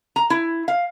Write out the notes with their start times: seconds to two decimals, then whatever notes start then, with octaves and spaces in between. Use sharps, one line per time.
0.16 A#5
0.30 E4
0.68 F5